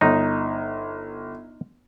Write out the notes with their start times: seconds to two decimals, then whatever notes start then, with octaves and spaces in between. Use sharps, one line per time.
0.01 G1 D#4